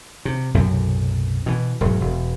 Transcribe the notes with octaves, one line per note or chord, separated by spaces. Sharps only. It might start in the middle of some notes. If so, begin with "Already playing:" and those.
C3
B1 F#2 A2 C3
B2 E3
E1 G#2 F#3
E1